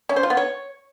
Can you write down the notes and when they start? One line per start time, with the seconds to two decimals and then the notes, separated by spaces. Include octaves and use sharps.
0.09 C#4
0.16 C5
0.23 F4
0.30 B3
0.37 C#5